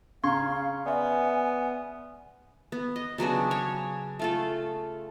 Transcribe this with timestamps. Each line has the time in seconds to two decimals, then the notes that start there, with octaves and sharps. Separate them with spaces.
0.24 C#3 F5 A#5 C6 C#6 G#6
0.86 B3 D5 E5 G#5
2.72 B3
2.96 D#5
3.18 C#3 F#3 B3 D4
3.51 C#5
4.19 A3 F4 A4